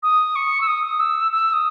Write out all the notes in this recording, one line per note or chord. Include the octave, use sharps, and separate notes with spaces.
D#6
C#6
E6
D#6
E6
E6
D#6